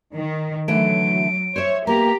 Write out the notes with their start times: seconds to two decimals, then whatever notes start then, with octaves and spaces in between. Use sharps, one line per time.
0.15 D#3
0.68 D3 E3 F#3 A3 D7
1.56 C5 C#5 E5
1.87 A#3 B3 G4 A#5